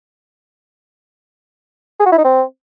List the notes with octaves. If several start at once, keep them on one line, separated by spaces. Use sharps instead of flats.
G#4
F#4
E4
D#4
C4